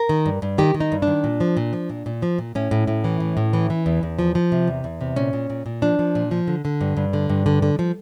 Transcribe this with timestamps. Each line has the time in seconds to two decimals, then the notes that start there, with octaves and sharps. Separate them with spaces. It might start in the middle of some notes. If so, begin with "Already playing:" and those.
Already playing: A#4
0.09 D#3
0.26 G2
0.42 G2
0.58 D#3 G4
0.74 D#3
0.80 D#4
0.92 G2
1.02 D4
1.07 D#3
1.24 A#2
1.40 F3
1.57 A#2
1.73 F3
1.90 A#2
2.06 A#2
2.22 F3
2.38 A#2
2.55 A2 C#4
2.71 A2
2.87 A2
3.04 E3
3.20 A2
3.37 A2
3.53 E3
3.70 E3
3.86 E2
4.03 E2
4.19 F3
4.35 F3
4.52 C3
4.67 E2
4.84 E2
5.01 C3
5.16 A#2 C#4
5.33 A#2
5.50 A#2
5.66 A#2
5.82 F3 D4
5.99 F3
6.15 A#2
6.31 F3
6.47 D3
6.65 D3
6.81 G2
6.97 G2
7.13 D3
7.29 G2
7.46 D3
7.62 D3
7.79 F3